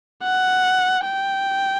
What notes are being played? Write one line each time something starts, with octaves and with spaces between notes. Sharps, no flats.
F#5
G5